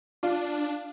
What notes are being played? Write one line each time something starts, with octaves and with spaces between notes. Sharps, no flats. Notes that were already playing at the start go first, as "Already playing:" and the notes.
D4 F4